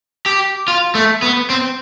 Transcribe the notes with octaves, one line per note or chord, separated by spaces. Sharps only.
G4
F4
A3
B3
C4